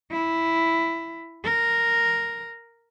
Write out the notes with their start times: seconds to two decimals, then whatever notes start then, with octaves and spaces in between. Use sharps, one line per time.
0.11 E4
1.45 A#4